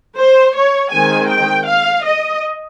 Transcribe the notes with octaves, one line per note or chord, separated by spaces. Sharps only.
C5
C#5
D#3 G#3 C4 G#5
G5
F5
D#5